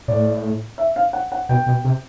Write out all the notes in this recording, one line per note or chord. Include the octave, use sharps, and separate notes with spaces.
A2 D5
E5
F5
F#5
F#5
B2 G5
B2
C3